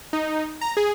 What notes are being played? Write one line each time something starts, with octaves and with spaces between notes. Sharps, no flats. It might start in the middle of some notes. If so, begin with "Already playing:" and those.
D#4
A#5
G#4